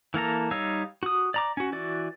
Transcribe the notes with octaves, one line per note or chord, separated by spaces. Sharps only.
E3 A#3 A4 A#5
G3 D#4 C#5 F5 E6
F#4 D#6
D5 A#5 D6
C#4 F#4
E3 F#4 D5